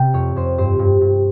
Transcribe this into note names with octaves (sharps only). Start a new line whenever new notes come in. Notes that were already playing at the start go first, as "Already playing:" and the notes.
Already playing: C3 G5
F2 C#5
F2 C5
G2 C5
G2
G2